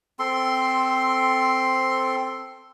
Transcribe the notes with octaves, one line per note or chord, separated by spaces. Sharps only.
C4 A4 C6